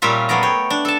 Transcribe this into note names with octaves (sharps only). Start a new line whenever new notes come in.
A#2 G3 C#4 F4 E5
F#2 A3 B3 G#4 D5 A#5
C#5 G5
D4
A4 A5